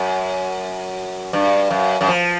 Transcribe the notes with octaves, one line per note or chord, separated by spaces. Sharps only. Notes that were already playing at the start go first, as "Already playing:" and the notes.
Already playing: F#2
G2
F#2
F#2
F3